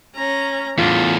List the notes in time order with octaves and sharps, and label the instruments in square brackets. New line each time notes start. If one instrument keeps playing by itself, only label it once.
[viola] C#4 A#5
[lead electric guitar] E2 A2 [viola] D4 [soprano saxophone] F4